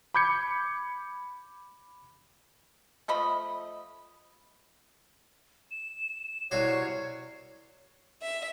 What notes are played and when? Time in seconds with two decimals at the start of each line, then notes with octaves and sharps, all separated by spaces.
0.14 B5 D6 G6 G#6 C#7
3.08 F3 A3 D#5 B5
5.71 E7
6.51 C2 F#4 C#5 C7
8.21 E5